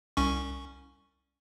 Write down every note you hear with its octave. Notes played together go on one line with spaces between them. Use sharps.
C2 C#4 C#6